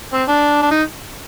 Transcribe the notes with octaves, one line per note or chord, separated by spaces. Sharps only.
C4
D4
D4
D#4